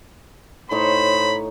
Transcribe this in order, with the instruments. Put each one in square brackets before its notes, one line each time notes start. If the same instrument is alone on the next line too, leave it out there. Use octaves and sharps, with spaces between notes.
[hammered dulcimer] A2 D#4 C#5 [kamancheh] C5 [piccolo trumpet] B5